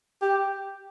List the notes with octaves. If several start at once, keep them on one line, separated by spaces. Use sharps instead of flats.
G4